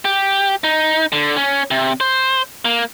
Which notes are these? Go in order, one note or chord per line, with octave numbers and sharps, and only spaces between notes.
G4
D#4
D3
C#4
C3
C5
A#3